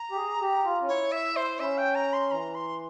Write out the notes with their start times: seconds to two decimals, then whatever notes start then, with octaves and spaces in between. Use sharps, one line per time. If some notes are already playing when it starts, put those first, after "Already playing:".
Already playing: A#5
0.11 G4
0.16 G#4
0.41 G4
0.65 F4
0.81 C#4
0.88 E4 C#5
1.12 E5
1.36 C5
1.60 C#4 E5
1.78 G5
1.95 A#5
2.13 C6
2.31 E3 A#5
2.55 C6